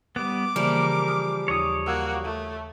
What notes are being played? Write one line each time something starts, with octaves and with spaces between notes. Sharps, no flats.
G3 B3 D6
C#3 E3 F3 G3 A#3 G#4 A#4
A#5 D#6 F6
D#2 F4 C#5 D#6
A#3 F#4 E6 G#6
A3